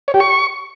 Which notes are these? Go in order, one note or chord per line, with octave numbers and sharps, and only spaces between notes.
C#5
G4
C#6